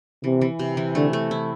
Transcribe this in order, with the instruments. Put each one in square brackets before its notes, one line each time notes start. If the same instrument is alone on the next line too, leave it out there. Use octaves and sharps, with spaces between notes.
[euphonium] C3 [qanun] E3
[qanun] E3
C3
E3
[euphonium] D3 [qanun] A3
[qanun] A3
E4